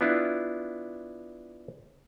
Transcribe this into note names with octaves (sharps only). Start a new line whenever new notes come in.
B3 D4 E4 F4